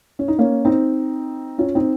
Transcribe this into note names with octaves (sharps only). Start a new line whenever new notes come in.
C#4
D#4
A#3 C#4
C4 D#4
C#4 F4
C4 D#4